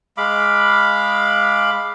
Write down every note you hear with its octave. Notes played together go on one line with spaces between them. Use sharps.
G#3 F5 B5 D6